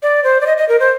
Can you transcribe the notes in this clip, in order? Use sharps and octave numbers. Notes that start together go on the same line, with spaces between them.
D5
C5
D5
D#5
D#5
A#4
C5